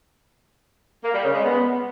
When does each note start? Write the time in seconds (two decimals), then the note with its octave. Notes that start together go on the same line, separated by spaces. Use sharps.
1.04 A#3
1.14 G3
1.24 C#3
1.35 G#3
1.45 B3